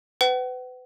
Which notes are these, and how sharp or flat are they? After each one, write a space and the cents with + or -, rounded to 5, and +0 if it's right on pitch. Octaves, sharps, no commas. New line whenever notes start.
B4 +35 F#5 +40